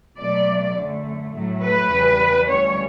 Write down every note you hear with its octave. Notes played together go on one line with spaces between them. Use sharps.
B2 F#3 A3 D5
F#2 D3 A3
A2 F#3 A3
B4
E2 C#3 G3
D2 C#3 E3 G3 C#5